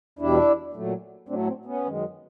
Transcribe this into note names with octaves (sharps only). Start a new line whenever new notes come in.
E2 B2 G3 D4 E4
A#2 F#3 A3
A2 F#3 A3 C4 D4
C4
B3 C#4
F#2 D#3 G#3